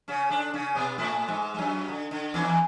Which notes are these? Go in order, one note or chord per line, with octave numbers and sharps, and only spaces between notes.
C#3 C#4
D3 D4
C#3 C#4
B2 B3
A2 A3
G#2 G#3
G#3
F#2 F#3
D3
D3
E2 E3